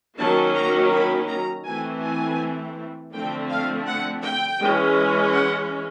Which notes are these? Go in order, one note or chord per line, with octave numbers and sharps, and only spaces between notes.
D#3 F#3 A#3 C#4 A5
A#5
B5
A#5
E3 A3 C4 G#5
G#5
D3 F3 A3 C4 G5
F5
F#5
G5
E3 G#3 C#4
F#5